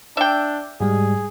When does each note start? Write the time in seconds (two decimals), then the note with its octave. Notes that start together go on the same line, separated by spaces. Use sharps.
0.17 D4 E5 G5
0.81 G#2 G3 G#3 G#4